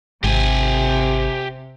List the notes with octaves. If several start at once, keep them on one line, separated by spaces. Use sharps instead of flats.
G#1 C3 G4 G#5